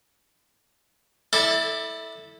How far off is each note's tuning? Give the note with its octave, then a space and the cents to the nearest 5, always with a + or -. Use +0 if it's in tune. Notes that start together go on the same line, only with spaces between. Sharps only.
E4 -15 A4 +0 D5 +25